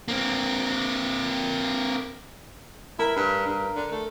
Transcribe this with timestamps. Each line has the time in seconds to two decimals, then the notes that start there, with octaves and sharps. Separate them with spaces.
0.08 A#3 C4
2.99 E4 A#4 B4
3.16 G2
3.47 G2
3.76 D3
3.92 A3